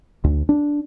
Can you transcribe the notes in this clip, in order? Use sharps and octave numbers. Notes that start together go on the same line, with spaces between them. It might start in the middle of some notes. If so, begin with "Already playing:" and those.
D2
D4